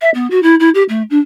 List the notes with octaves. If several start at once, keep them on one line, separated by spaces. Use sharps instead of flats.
E5
B3
F#4
E4
E4
G4
A3
D4